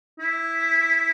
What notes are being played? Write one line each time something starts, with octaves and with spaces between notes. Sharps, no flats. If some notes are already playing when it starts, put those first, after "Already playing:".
E4